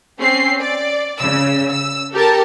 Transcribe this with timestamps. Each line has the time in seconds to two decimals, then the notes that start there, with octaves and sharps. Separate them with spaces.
0.20 C4 C#4 C7
0.60 D5
1.19 C#3 E6
1.71 E6
2.12 G4 A4 A#4 A5